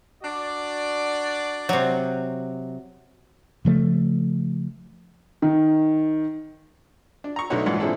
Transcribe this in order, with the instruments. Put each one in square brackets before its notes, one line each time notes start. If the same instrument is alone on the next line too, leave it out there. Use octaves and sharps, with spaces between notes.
[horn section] D4 F#4 D5
[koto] C3 F#3
[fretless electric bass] C#3 F3 A3
[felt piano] D#3
[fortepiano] D4
A#5 C#6
B1 A3 D4 D#4 F#4 C#5
A#1 G#2 E3 F#5
A#2 D3 C4 E4 G#4 A4